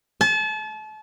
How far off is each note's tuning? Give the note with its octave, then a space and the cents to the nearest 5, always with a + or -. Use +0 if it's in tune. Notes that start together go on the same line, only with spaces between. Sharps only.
A5 -35